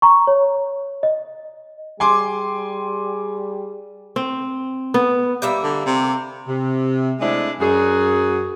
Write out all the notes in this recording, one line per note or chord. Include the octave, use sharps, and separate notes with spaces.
A#5 C#6
C#5
D#5
G3 G#4 G#5 C6 D6
C4
B3
G3 A#3 E5
D3
C3
C3
G#3 A3 C4 D4 E4
F#2 F#4 G#4